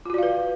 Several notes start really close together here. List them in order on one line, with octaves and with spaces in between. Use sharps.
F4 F#4 D5 F5 B4